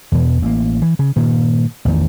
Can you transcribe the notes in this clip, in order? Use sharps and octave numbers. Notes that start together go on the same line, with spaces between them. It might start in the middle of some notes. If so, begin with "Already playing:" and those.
E2 B2 E3
A1 A#3
E3
C#3
G2 A#2 D#3
A1 E2 D#3